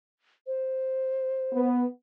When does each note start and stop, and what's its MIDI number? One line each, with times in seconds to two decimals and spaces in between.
0.47 1.68 72
1.52 1.83 59